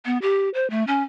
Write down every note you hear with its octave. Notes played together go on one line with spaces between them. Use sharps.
B3
G4
C5
A3
C#4